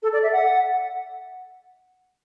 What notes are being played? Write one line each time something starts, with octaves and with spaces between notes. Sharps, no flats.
A4
D5
E5
F#5